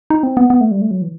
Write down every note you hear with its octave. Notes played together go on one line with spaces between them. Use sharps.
D#4
C4
B3
B3
A3
G3
A3
F#3
E3